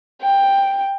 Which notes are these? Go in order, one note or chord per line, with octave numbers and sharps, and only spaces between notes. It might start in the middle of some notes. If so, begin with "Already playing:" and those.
G5